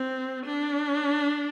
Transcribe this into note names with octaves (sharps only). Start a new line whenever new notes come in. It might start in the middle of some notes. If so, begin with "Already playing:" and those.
Already playing: C4
D4